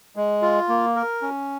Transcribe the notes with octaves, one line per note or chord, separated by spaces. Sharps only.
G#3
F4
A#3
A#4
C#4